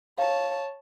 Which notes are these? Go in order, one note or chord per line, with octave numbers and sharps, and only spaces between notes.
C#5 F5 A5